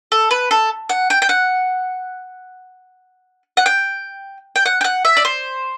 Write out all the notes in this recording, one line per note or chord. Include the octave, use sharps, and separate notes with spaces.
A4
B4
A4
F#5
G5
G5
F#5
F#5
G5
G5
F#5
G5
F#5
E5
D5
C5